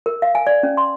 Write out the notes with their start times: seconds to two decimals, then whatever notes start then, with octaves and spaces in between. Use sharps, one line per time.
0.06 A#4
0.22 F5
0.35 G#5
0.47 D5
0.63 C#4
0.77 C6